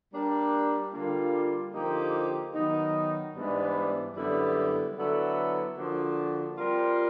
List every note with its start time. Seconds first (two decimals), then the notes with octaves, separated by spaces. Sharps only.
0.11 G3 A#3 D4 G4
0.93 D3 G3 A#3 D4 F4
1.73 D3 F3 A#3 D#4 G4
2.54 D#3 F#3 B3 D#4
3.35 G#2 E3 G3 B3 D4
4.15 F#2 D3 G3 B3 E4
4.96 D3 F#3 B3 E4 A4
5.77 D3 F3 A#3 D4 F#4
6.58 G3 C4 F4 A#4